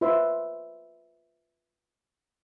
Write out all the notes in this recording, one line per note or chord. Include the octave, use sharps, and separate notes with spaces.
F4 B4 C5 E5 C6